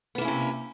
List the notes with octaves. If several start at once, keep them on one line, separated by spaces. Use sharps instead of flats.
C3 A#3 B3 C#4 E4